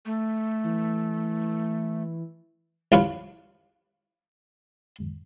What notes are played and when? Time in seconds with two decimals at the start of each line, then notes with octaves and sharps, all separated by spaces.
0.05 A3
0.64 E3
2.92 C2 F4 B4 C#5